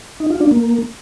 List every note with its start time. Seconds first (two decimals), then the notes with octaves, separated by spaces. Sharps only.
0.20 D#4
0.30 F4
0.41 D4
0.51 A#3